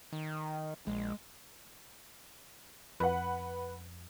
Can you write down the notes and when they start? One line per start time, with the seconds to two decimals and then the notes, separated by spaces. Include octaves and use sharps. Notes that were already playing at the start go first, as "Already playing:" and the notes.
0.12 D#3
0.87 A#1 G#3
3.00 F2 B4 F#5